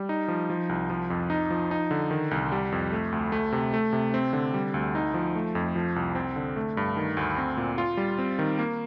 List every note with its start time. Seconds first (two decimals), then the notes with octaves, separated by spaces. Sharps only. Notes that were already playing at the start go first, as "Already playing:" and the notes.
Already playing: G3
0.09 D#4
0.28 F3
0.50 F3
0.69 C2
0.90 F3
1.10 F2
1.30 D#4
1.51 F3
1.71 D#4
1.91 D3
2.11 D#3
2.31 C2
2.52 G3
2.72 F2
2.92 A3
3.12 D2
3.32 A3
3.52 C3
3.74 A3
3.93 C3
4.14 C4
4.33 D3
4.54 G3
4.74 D2
4.95 D#4
5.14 F3
5.35 A3
5.55 F2
5.75 F3
5.96 C2
6.15 C4
6.36 D3
6.56 A3
6.77 G2
6.97 D#3
7.17 D2
7.38 C4
7.57 A#2
7.78 F4
7.97 G3
8.19 C4
8.39 D#3
8.59 A#3